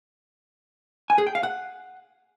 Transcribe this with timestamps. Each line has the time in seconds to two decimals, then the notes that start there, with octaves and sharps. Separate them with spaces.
1.10 G#5
1.18 G#4
1.27 G5
1.35 F5
1.43 F#5